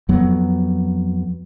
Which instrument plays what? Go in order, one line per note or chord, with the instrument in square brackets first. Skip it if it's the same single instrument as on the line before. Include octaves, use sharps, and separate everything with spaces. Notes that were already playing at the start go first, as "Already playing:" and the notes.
[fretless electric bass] F2 F#3 B3